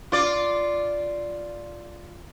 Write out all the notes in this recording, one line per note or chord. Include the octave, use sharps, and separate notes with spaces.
F4 D5